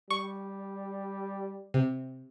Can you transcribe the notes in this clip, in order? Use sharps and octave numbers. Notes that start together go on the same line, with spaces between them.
G3 C#6
C3